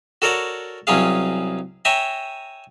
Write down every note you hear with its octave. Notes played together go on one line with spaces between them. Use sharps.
F#4 A4 A#4 C#5 D5 F#5
C2 F#3 C#4 G#4 F5
C#5 E5 G5 G#5 A#5